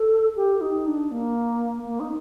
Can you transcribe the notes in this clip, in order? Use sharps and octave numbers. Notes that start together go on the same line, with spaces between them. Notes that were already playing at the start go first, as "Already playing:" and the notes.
Already playing: A4
G4
D#4
D4
A#3
A#3
D#4